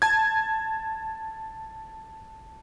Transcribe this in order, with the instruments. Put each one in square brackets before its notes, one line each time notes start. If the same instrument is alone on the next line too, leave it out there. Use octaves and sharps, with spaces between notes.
[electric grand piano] A5 G#6